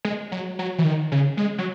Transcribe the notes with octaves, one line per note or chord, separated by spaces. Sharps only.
G#3
F#3
F#3
E3
D#3
C#3
G#3
F#3